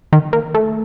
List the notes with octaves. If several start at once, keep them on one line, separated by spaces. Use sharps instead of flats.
D#3
A#3
A3